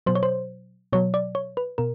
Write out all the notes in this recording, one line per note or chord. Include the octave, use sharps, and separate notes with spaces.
B2 F#3 C5
C#5
C5
B2 F#3 C#5
D5
C#5
B4
B2 A#4